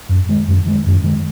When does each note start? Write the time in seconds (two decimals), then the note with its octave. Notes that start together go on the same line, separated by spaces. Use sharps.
0.09 F#2
0.29 D#3 G#3
0.48 F#2
0.66 D#3 G#3
0.86 F#2
1.04 D#3 G#3